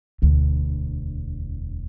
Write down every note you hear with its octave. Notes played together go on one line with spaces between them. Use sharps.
E1 D2